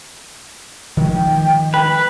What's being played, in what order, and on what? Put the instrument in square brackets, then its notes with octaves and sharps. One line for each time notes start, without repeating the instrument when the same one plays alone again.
[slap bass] D#3 F3 G#3 [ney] G5
[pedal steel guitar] B4